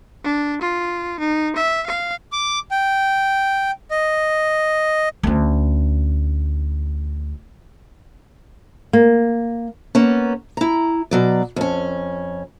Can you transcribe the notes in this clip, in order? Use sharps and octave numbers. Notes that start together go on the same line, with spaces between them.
D4
F4
D#4
E5
F5
D6
G5
D#5
D2 C#4
A#3
A#3 B3 C#4
E4 A#5
B2 F#3 D5
F2 C#4